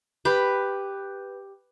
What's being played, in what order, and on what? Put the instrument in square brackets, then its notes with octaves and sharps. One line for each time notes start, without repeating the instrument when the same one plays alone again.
[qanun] G4 B4